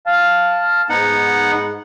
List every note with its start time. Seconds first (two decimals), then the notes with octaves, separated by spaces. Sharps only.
0.06 F5 A5
0.89 G#2 B3 D#4 F#5